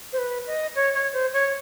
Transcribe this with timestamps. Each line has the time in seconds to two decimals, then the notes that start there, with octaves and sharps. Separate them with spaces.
0.13 C5
0.18 B4
0.47 D#5
0.76 C#5
0.94 C#5
1.13 C5
1.33 C#5